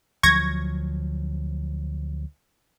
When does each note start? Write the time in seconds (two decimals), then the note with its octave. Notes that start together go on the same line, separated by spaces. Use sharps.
0.23 D2 F3 F#3 C#6 G#6 A#6